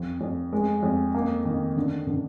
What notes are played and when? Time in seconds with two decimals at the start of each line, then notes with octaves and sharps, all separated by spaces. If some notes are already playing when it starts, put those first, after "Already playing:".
Already playing: F2
0.21 F2
0.53 G#3
0.83 F2
1.15 A#3
1.45 D#3
1.77 D3
2.07 D3